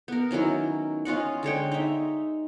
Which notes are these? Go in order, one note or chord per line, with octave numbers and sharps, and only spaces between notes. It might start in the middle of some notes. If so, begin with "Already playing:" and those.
B3 A#4
D#3 F#3 C#4 E4
C#4 F4 D#5 F#5
D3 G#3 C#5 G5
D#4 E5